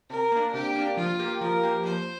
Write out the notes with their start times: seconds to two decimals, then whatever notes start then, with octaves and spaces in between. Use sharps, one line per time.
0.10 C3 A#4
0.32 A#3 D4
0.54 C3 G4
0.76 A#3 D4
0.97 F3 F4
1.19 A#3 G4
1.41 F3 A#4
1.64 A#3 G4
1.85 F3 C5